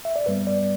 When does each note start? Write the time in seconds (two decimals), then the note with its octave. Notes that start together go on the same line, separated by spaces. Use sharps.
0.05 E5
0.16 D5
0.26 G2 G3 B3 B4
0.47 D5